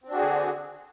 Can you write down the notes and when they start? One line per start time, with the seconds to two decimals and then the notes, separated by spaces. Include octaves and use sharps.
0.04 C4
0.08 D4
0.12 F#4
0.16 G#4
0.21 D3